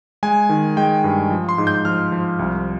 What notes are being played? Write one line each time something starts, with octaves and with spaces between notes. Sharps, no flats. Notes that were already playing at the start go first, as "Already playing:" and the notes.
G#3 G#5
D#3
G#3 G5
G2
F3
C6
G#2
G6
F3 F6
F3
C2